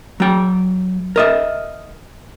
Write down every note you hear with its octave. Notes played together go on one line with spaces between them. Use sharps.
F#3 G5
A#4 D#5 E5